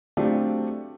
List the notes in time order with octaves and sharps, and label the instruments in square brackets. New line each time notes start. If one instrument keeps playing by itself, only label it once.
[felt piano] F#3 A3 C4 D4 F4 G4